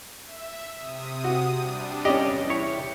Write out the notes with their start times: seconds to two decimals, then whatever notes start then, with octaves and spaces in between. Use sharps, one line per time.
0.22 E5
0.75 C3 D#6
1.24 F#4
1.56 G3 D4
2.05 E2 C#4 G4 D5 D#5
2.49 E4 G4 C#5